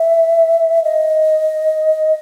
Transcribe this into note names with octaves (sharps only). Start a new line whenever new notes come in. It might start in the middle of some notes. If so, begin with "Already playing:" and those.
Already playing: E5
D#5